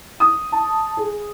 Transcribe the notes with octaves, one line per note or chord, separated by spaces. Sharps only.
D#6
A5
G#4